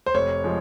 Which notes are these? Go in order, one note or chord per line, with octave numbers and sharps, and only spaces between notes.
C5
F1 C#5
F3 G#3